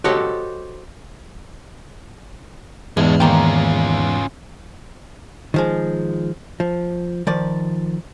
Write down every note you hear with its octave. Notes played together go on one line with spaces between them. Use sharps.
F#4 G4 A4 C5 C#5 D#5
E2 G#2 G#3 D4
D#3 A#3 C#4 F4 G5
D#3 F3 G#3
F3
D#3 F3 D5